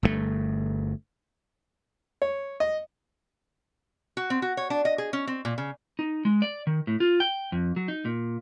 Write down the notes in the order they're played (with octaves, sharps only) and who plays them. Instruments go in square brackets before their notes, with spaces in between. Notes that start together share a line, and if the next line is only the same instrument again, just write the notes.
[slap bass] G1 G2 A#2 A3
[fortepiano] C#5
D#5
[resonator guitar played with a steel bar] F#4
C4
F#4
C#5
D4
D#5
G#4
C#4
C4
A#2
C#3
[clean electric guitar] D#4
G#3
D5
D#3
A2
F4
G5
F2
F#3
D#4
A#2